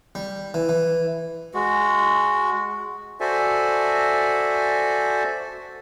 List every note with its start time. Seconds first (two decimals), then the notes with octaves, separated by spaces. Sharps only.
0.15 G3
0.54 E3
0.69 E3
1.54 G#3 F#4
3.20 F#4 A4 C5 D5 E5 G#5